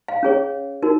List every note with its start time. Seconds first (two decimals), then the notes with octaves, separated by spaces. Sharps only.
0.08 F5
0.23 C#4 G#4 C#5
0.83 D#4 F#4 A#4